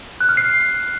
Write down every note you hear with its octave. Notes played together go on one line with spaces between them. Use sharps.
F#6
F6
C7